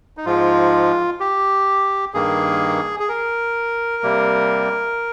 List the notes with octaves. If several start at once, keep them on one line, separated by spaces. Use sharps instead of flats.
D#4
G#2 F3 G#3 F4
G4
G2 D#3 A#3 G#4
G#4
A#4
C3 G3 A#3